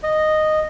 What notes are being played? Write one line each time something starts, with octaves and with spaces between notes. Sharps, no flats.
D#5